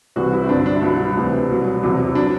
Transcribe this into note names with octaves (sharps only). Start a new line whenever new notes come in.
C2 C3 E3 F#4
E4
C4
G2 D3 F#3 D4
D4
E4
C2 B2 F#3 D4
D2 C3 E3
C2 B2 F#3
E2 C3 F#3
F#3 D4